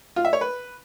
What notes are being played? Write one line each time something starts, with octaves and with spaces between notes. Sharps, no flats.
F4
E5
C#5
B4